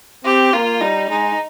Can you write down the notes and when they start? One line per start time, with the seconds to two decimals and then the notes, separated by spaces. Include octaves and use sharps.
0.24 C4 G4
0.53 A#3 F4
0.81 G3 D#4
1.09 G#3 D#4